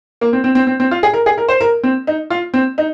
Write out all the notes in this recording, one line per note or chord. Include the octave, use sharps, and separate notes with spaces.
A#3
C4
C4
C4
C4
C4
F4
G#4
A#4
G#4
A#4
C5
A#4
C4
D#4
F4
C4
D#4